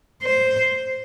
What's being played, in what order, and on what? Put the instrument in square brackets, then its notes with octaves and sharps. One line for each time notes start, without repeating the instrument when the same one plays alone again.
[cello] C5